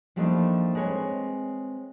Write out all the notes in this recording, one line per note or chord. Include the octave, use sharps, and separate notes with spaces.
F3 G3 A3 A#3 D4 D#4
G#3 C4 B4 C#5